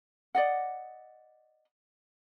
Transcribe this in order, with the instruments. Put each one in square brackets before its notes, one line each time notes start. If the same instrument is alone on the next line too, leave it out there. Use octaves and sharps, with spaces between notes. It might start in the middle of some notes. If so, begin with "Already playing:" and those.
[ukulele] D5 D#5 F#5